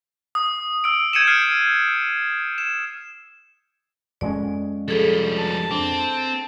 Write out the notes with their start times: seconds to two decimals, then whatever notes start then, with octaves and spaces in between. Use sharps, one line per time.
0.35 D#6
0.84 E6 D7
1.13 G6 G#6 C#7 D#7 E7
1.27 F6 C7
2.58 E7
4.21 F2 G#3 C#4 D5
4.88 F3 G3 G#4 A4
5.38 A5
5.71 C4 D4